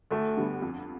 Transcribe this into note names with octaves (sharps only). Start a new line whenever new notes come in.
D2 A3
D3 G3 B3
F2